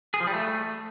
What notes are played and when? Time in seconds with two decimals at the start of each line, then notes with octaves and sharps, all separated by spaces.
0.14 G#4
0.20 F3
0.27 G3
0.34 A3